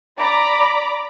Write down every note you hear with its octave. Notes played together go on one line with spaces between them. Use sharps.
D5 A#5 B5 D6